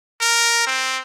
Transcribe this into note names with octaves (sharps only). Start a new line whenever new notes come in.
A#4
C4